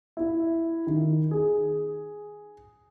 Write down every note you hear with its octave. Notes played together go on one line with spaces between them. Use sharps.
E4
D#3
G#4